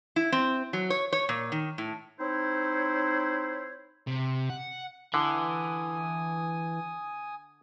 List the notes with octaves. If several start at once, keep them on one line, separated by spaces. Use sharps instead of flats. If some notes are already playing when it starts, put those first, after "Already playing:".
E4
C4
F#3
C#5
C#5
A#2
D#3
A2
C4 D#4 E4 C5 C#5
C3
F#5
D3 E3 G#5 D#6